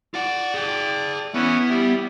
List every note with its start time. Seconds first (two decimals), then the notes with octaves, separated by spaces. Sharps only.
0.14 F4 D5 F#5
0.54 G#4 G5
1.34 E3 B3 C#4 E4
1.70 G3 E4